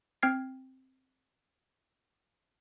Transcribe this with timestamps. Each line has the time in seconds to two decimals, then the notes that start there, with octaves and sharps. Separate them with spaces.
0.23 C4 G5 F6 G#6 C7